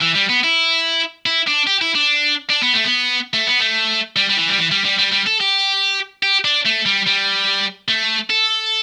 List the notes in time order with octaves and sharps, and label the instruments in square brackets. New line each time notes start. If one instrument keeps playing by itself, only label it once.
[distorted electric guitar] E3
G3
B3
E4
E4
D4
G4
E4
D4
D4
B3
A3
B3
A3
B3
A3
G3
G3
E3
G3
E3
G3
G3
G3
G3
A4
G4
G4
D4
A3
G3
G3
A3
A4